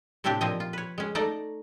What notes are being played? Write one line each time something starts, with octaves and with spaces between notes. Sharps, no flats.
A2 C3 A3 C4 D4 G4
A#2 F3 C4 D#5
F4
B4 C#5
G#3 C#4
A3 D#4 D5 A#5